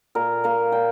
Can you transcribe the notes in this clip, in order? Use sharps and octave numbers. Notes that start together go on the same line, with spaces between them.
A#2 A#4
A#3 A#4
A#2 G5